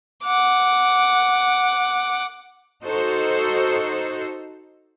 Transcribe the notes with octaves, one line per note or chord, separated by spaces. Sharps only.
F#5 D6
D#4 F#4 A4 C5